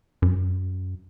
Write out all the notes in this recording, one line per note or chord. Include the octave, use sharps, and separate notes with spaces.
F#2